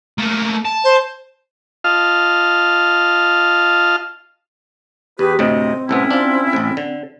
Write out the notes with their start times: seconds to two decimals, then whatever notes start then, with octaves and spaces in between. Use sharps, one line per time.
0.18 A3 A#3
0.65 A5
0.84 C5
1.84 F4 D#5 F5 A5 F6
5.19 E2 G4 G#4 B4
5.39 D2 A2 C3 C4 D#5
5.89 C2 A2 B3 C#4 E4
6.11 D4 F4
6.53 A1 A2
6.77 D3